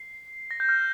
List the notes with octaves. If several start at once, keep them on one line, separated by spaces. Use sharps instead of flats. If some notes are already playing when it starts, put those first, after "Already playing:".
Already playing: C7
A#6
G6
F6